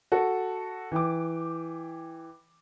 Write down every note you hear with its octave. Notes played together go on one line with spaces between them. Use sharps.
F#4 A4
E3 G5 D6